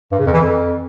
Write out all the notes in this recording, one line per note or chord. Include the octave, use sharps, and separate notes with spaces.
G2
C#3
F2
E3
F2